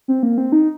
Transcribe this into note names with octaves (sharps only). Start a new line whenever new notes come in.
C4
A#3
C4
D#4